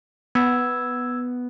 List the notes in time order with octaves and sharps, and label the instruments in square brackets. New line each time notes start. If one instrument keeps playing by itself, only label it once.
[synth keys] B3 [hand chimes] E6 G#6